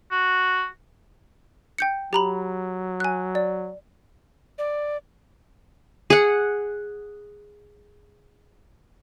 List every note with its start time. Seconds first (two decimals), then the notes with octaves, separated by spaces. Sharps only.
0.11 F#4
1.78 G5 G6 C#7
2.13 F#3 G4 A#5 B5
3.00 G#5 F#6
3.35 D5
4.58 D5
6.10 G#4 F#5